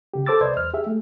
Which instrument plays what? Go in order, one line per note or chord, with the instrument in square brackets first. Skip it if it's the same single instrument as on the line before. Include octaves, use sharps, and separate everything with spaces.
[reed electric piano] C#3 G4
A4 C5 D6 E6 A6
C2 B4 C5 D5 D#5 G#6
E2 F6
G4 G#4 E5
A3